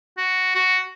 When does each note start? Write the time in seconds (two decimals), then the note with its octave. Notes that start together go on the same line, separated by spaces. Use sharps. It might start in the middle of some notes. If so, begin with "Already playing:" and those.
0.18 F#4
0.55 F#4